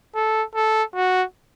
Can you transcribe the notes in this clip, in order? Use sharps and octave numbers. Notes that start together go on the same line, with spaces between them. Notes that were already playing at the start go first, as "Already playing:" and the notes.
A4
A4
F#4